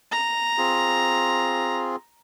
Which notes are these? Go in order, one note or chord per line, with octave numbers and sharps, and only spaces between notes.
A#5
C4 F4 G#4